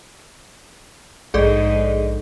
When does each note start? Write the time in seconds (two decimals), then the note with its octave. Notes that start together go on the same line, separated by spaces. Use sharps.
1.34 A#1 G#2 D#4 G#4 A4 D5